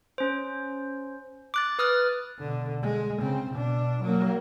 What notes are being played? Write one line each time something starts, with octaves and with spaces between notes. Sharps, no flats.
C#4 C5
D6 F#6 A6
B4 D#6 F6 F#6 A6
B2 D3
G#3
C#3 C4
B2 D4
F#3 A#3